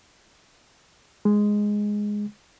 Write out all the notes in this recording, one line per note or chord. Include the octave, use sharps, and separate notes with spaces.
G#3